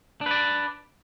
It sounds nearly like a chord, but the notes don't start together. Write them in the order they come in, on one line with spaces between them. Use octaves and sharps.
D4 B4 D5